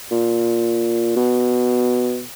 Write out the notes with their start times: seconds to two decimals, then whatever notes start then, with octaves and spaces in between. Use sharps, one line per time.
0.11 A#2
1.16 B2